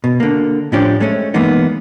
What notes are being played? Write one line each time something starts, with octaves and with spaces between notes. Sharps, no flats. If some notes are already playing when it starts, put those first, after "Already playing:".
B2
D3 A#3
A2 F3 C#4 D4 G4
G#3 A3 C#4
E3 G#3 A#3 B3 D#4